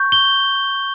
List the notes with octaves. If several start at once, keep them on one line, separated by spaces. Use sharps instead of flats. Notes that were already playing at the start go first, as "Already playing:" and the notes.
Already playing: C#6 G6
G7